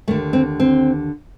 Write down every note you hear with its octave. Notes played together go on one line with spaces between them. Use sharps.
D#2 D3 A3
C4
C4